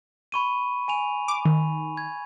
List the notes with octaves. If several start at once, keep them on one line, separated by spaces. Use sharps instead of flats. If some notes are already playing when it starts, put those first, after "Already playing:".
B5 C#6 D#7
G#5 D#7 F7
D6
D#3
G#6